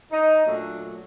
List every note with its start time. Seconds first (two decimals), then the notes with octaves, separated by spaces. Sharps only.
0.11 D#4
0.46 A#2 F#3 A3 D4